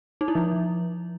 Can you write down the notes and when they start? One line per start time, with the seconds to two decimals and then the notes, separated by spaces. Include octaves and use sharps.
0.21 D#4
0.28 E4
0.35 F3